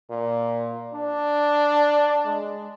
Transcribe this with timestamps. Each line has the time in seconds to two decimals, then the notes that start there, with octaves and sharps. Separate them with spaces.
0.10 A#2
0.94 D4
2.26 G#3